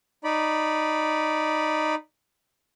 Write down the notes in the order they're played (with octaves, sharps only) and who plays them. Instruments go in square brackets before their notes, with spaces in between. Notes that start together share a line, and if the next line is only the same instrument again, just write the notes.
[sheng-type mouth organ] D#4 D5 B5